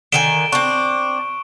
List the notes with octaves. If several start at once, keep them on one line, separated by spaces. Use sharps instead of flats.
D3 D#3 G#5 D7 E7 G7
C4 D4 C#6